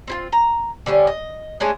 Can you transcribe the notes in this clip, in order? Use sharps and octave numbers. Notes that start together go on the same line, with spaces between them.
C4 E4 F4
A#5
D3 G3 C4 C#4
D#5
G#3 A3 C#4 D4